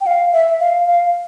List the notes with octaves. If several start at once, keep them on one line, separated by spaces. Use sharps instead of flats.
G5
F5
E5
F5
F5